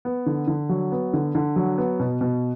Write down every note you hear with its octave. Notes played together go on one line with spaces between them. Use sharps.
B3
D3
D3
F#3
B3
D3
D3
F#3
B3
B2
B2